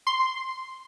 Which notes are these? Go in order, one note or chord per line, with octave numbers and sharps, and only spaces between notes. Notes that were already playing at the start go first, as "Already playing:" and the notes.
C6